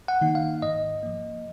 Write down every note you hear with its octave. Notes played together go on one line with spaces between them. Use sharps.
F#5
D#3 A#3 D#4
F5
G#2 D#5
F3 A#3